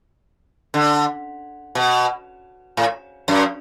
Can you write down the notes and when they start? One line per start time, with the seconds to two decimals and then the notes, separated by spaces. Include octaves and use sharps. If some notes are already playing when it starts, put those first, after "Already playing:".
0.74 D3
1.75 B2
2.77 A2
3.28 F#2